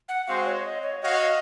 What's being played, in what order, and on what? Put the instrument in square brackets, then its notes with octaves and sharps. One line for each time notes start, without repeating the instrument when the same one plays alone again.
[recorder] F#5
[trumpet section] G#3 C4 F#4 C5 [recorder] F5
[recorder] C#5
D#5
C#5
[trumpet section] F#4 C#5 F5 [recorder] D#5